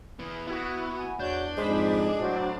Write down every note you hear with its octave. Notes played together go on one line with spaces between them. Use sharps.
E3 B3
B3 E4 F#4
G#5
E2 D4 F#4 C#5 G6
F2 G#2 G#3 C5 B5
A2 F#3 F#4 C5